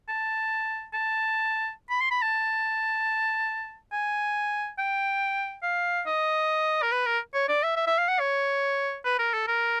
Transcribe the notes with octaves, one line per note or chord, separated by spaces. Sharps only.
A5
A5
B5
C6
B5
A5
G#5
G5
F5
D#5
A#4
B4
A#4
C#5
D5
E5
E5
E5
F5
F#5
C#5
B4
A#4
A4
A#4